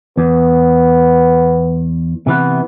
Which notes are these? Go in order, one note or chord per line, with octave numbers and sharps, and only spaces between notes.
E2 B3
C3 E3 B3